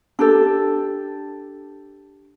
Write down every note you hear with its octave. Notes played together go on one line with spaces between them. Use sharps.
D4 G4 A4